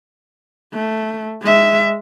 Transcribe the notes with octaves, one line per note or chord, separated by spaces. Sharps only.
A3
G#3 E5